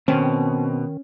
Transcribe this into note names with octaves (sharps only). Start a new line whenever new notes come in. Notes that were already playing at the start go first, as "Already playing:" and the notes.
B2 D#3 C4 C#4